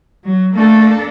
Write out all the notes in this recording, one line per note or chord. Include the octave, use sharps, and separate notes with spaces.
F#3
A3 A#3 D4 A4